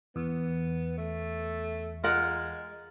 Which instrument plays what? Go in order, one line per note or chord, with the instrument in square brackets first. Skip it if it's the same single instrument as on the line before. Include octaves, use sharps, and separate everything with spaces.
[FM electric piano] E2 [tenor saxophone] B3
[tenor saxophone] A3
[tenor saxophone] G#3 [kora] F4 A#4 F#5